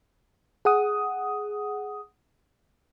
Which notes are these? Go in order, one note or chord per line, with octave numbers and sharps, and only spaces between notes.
G#4 F#5 D#6